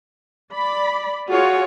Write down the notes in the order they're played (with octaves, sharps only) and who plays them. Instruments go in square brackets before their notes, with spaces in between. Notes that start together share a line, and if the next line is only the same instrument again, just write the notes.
[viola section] D5 B5
[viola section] F4 G#4 C#5 [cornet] F#4